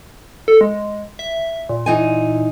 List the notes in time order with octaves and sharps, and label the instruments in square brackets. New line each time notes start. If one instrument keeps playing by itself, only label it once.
[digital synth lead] A4
G#3
E5
A#2
[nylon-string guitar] E3 D#4 G#5